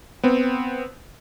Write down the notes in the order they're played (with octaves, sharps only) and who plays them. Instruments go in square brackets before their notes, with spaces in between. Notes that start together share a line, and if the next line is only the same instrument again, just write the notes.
[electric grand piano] B3 C4